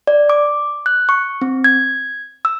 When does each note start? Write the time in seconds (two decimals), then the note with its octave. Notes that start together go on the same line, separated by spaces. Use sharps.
0.07 D5
0.30 D6
0.86 F#6
1.09 C#6
1.41 C4
1.64 G#6
2.45 E6